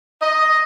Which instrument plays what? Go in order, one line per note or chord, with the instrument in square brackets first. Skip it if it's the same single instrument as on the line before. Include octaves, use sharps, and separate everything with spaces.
[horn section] D#5